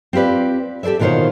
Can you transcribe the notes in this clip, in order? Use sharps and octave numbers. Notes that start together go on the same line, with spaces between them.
C4 F4 G4 B4 D5
G4 A4 C5 D5 E5
E2 B2 D#3 F4 C5 C#5